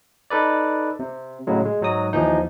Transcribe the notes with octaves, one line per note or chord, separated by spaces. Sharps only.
D#4 A4 B4 D5
C3
A2 C#3 F#3 G#3
G#3
G#2 F#3 D#4 F#4 D#6
D#2 E3 F3 D#4